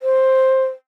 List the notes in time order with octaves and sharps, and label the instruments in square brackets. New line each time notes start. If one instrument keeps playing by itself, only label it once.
[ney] C5